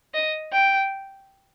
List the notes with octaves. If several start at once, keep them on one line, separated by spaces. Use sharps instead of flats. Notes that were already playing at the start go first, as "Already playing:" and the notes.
D#5
G5